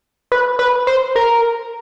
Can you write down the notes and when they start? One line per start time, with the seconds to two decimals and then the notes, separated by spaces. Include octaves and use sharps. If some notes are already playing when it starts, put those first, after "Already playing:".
0.32 B4
0.59 B4
0.87 C5
1.16 A#4